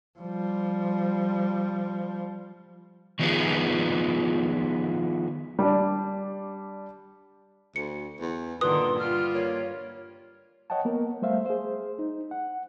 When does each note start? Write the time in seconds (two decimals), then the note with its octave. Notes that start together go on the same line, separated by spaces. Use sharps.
0.19 F3 G3
3.19 D#3 F3 B3 D#4 F4 G#4
5.59 G3 D4
7.76 D2 C#7
8.20 E2
8.61 G2 A#2 D3 D#3 B4 C6 D#6
8.98 G3 F4 F6
9.33 A#3 C#5
10.70 C#5 D#5 F#5 G5 A5
10.85 A#3 B3 A#4
11.22 G3 A3 C5 E5 F5
11.46 G#4 C5
11.99 D#4
12.31 F#5